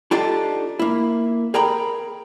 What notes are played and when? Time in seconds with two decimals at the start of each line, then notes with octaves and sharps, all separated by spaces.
0.11 D4 D#4 F4 G4 A4
0.79 A#3 E4
1.54 G#4 A#4 G5 A#5 B5